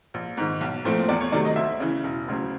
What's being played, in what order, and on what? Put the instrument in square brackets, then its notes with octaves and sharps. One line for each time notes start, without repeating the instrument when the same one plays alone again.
[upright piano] A#1
G#2 D#3
B1
A#2 F3 A3 C4
E2 D5
C#5
C3 D#3 F#3 A3 D5
D#5
D2 E5
C#3 E3
E1
D2 C#3 F#3